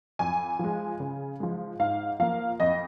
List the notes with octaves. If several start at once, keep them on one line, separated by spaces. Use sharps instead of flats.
F2 G#5
F3 G#3
C#3
F3 G#3
G#2 F5
F3 A#3 F5
F2 D#5